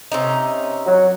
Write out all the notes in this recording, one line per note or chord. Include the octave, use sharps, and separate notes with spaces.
C3 C#4 D#4
F#3